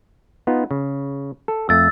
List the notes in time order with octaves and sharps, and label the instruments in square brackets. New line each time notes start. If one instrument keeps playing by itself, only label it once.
[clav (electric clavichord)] B3 D#4 F4
C#3
A4
[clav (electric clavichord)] F2 A3 [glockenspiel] E6 A6